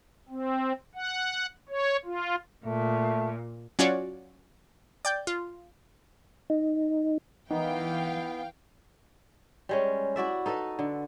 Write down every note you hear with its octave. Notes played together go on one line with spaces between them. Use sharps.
C4
F#5
C#5
F4
A#2 A3
F#3 C#4 F4 F#4 C#5 D5
D5 G5 G6
F4
D#4
E3 B3 D#4 F5 G5
G3 G#3 C#4
E4 F#4 D5 E5
D#4 A4 B4 D#5
D3